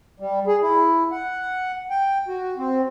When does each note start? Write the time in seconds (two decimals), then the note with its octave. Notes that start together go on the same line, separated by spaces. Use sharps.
0.20 G3
0.47 G#4
0.62 E4
1.12 F#5
1.90 G5
2.28 F#4
2.58 C4